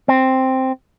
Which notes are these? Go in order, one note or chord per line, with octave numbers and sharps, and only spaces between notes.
C4